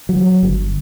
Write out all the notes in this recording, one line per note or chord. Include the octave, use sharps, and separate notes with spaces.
F#3
G1